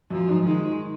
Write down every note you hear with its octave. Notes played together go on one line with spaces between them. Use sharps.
F#2 F3
G#2
D#3 G#3